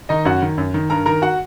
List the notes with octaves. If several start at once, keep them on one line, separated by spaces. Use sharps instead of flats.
D#3 D#4 D#5
F#2 F#4 F#5
D#3
F#2
D#3
G2 A#4 A#5
D#3 A#4 A#5
F#4 F#5